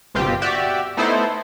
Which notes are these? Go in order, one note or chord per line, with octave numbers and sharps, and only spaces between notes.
G1 B2 C4 F4 G4
F#4 G4 D5 E5
A3 B3 D#4 E4 A4 C5